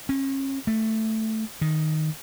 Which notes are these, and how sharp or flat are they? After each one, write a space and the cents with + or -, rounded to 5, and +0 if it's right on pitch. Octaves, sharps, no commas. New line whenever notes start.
C#4 -35
A3 +5
D#3 +0